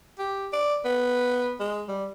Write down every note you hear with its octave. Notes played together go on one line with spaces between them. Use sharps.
G4
D5
B3
G#3
G3